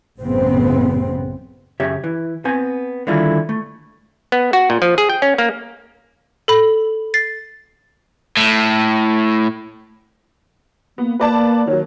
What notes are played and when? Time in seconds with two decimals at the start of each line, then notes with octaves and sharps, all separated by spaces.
0.21 A1 F#2 A2 C#3 B3 C4
1.80 F#2 C#3 G4 C#5 E5
2.04 E3
2.45 B3 C4 G#5
3.07 D3 D#3 G3 E4 F4 G#4
3.49 A3
4.32 B3
4.53 F#4
4.70 A#2
4.82 F3
4.98 G#4
5.09 G5
5.22 C#4
5.38 A#3
6.48 A4 B5
7.14 A6 C7
8.37 A2
10.98 A#3 B3
11.19 A#3 B4 D5 A5
11.67 D#3 F#3 C#5